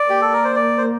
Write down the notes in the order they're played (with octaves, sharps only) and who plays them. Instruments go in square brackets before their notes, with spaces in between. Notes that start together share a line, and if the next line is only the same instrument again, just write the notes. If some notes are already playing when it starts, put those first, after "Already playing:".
Already playing: [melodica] D5
[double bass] A#3 [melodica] G4
[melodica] A4
A#4
C5
D5
C5